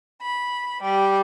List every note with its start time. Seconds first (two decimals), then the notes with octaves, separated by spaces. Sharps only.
0.21 B5
0.82 G3